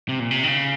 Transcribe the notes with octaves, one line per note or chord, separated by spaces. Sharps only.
C3
A#2
C3
D#3
C#3